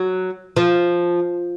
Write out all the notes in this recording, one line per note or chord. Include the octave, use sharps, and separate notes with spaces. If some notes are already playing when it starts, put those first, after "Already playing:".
Already playing: F#3
F3